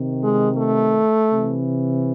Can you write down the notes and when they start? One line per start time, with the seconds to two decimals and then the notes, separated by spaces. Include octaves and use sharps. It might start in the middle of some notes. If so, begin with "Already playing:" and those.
Already playing: C3 D#3
0.23 G#3
0.58 A3
1.32 C3 E3